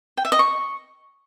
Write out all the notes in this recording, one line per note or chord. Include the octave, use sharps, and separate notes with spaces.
G5
E5
D#5
C#6